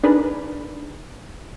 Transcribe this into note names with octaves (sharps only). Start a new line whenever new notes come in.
D4 D#4 G#4 A#4 B4